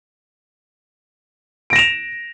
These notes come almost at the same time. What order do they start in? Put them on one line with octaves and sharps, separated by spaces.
D7 A#6 E7 F7